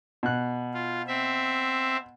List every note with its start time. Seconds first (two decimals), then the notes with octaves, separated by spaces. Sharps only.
0.23 B2 F#6
0.74 F4
1.07 C4 E5